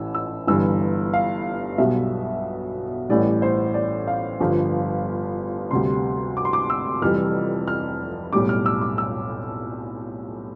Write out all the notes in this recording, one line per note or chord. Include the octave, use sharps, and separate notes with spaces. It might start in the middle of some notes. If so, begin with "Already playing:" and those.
Already playing: A1 A2 E3 E6
E6
G1 G2 E3 E6
F5
B1 B2 G3 E5
A1 A2 E3 G3 D5
C5
D5
F5
G1 G2 F3
D2 C3 G3 C6
D6
C6
D6
E6
F1 F2 E3 G3 F6
F6
B1 A2 G3 D6
F6
E6
D6
E6